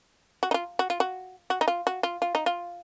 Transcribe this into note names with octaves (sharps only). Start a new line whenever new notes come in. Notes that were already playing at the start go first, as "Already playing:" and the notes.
F#4
D#4
F4
F#4
F4
F#4
F#4
D#4
F4
F#4
F4
F4
D#4
F4